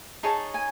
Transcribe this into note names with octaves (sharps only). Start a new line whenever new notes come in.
D#4 G#4 C#5 A5
G#5